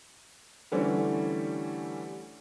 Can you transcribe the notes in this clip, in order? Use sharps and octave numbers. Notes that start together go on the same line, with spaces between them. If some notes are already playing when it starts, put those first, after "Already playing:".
D3 E3 G3 A3 C#4